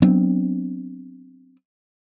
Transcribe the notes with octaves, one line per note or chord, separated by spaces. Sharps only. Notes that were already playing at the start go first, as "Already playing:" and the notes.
F#3 B3 C4 D4